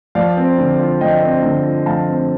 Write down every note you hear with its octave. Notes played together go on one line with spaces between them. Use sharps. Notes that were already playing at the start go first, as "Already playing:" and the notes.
F3 D5 F5
C4
D3
F4
F3 D#5 G5
C4
D3
F4
F3 F5 A5
C4